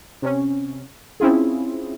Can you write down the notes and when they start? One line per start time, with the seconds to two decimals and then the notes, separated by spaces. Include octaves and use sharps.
0.22 C3 C#4
1.20 C4 C#4 E4 F4 G#4